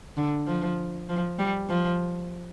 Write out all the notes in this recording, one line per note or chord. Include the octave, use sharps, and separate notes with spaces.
D3
F3
F3
G3
F3